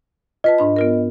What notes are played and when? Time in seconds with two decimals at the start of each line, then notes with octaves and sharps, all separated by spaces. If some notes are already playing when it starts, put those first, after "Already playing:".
0.44 F4 B4 D#5 A5
0.58 G#2 D4 B5
0.76 B3 F4 A#4